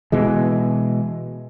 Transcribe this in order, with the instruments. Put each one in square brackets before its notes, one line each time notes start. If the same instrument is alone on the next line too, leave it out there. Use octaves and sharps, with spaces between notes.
[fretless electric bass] B2 E3 G#3